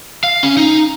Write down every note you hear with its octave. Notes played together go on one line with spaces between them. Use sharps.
F5
C#4
D#4